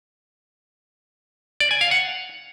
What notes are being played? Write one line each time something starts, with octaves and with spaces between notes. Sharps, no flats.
D5
G#5
F5
F#5